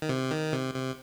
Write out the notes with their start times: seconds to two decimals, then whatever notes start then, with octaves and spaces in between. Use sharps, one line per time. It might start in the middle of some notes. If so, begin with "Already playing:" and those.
0.02 D#3
0.09 C3
0.31 D#3
0.53 C3
0.74 C3